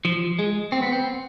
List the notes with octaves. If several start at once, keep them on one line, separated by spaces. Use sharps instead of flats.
F3
G#3
C4
B3
C4